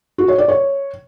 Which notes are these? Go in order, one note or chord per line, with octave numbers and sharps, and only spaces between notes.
F#4
C#5
D5
C#5